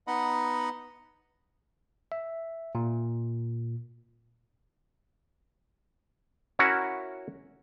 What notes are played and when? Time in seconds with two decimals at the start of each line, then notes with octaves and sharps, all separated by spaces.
0.07 B3 D#4 D#5 F#5 B5
2.12 E5
2.75 A#2
6.59 C#4 E4 F#4 A#4 E5 F#5